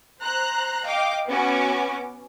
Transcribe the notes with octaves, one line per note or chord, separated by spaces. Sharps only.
C5 A#5 F#6
D#5 F5 G5 D6
B3 C#4 F#4 D6